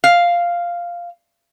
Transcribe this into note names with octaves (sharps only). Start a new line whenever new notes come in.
F5